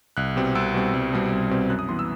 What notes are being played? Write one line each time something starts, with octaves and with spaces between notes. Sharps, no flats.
C2 F#6
B2 G3 C4
C2 E6
B2 G3 C4
C2
B2 G3 C4
C2
B2 G3 C4
F#2 F#6
D#6
E3 B3 C6
E6